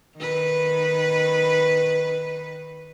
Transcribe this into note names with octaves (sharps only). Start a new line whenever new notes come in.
D#3 B4